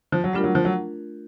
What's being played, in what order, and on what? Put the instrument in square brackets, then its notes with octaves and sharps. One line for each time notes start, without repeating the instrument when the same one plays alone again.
[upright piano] F3
F#3
[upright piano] G3 [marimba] A3 D4 F4 A#4
[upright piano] F#3
F3
F#3